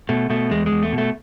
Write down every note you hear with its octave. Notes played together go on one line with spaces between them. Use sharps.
B2 A3
B2 A3
E2 G#3
G#3
E2
A3
B2
A3